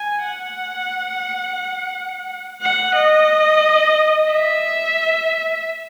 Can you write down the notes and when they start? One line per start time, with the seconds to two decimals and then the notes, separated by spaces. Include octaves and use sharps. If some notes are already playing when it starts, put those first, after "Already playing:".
Already playing: G#5
0.25 F#5
2.62 F#5
2.96 D#5
4.31 E5